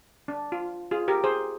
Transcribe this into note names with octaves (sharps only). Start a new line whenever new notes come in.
D4
F4
F4 G#4
G4 A#4
G#4 C5